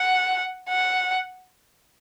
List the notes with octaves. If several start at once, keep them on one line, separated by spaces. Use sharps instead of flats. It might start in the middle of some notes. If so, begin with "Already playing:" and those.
Already playing: F#5
F#5